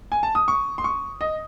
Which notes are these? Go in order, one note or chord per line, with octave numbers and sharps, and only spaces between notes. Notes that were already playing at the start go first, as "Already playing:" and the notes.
G#5
A5
D#6
C#6
C6
C#6
D#5